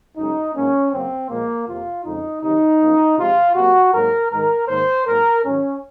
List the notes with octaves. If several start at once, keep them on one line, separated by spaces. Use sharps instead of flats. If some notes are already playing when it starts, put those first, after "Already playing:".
F#2 C#3 G#3 D#4
G#2 F#3 A#3 C#4
F#2 C#3 F#3 A#3 C4
A#2 F3 G#3 A#3
F2 C3 F3 A#3 F4
F2 C#3 G#3 D#4
C3 D#3 F#3 D#4
F#2 F3 A#3
C3 F3 G#3 F4
C3 F#3 A#3 F#4
G#2 F#3 A#3 A#4
G#2 D#3 G#3 A#4
G#2 D#3 A#3 C5
G#2 F#3 A#3 A#4
G#2 D#3 F#3 C#4